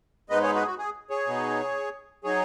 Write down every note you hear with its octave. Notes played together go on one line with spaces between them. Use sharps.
G#2 G#3 B3 D#4 B4 D#5
G#4 C#5
F#4 B4
G#4
F#4
G#4
G#4 C#5
B2 B3 D#4
F#3 D#4 G#4 C#5